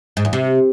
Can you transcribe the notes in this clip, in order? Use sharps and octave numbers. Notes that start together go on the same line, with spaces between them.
G#2
E2
C3